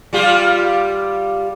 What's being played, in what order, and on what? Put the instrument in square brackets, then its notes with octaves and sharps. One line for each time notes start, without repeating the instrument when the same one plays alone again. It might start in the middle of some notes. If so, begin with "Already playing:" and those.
[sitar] G3 F4 G4